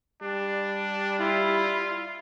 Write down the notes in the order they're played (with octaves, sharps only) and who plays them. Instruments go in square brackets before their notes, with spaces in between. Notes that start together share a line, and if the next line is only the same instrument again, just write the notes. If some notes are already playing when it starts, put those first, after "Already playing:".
[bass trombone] G3 [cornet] D4
[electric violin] E4 [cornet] F4